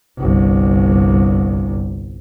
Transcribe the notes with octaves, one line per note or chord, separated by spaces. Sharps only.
G1 C2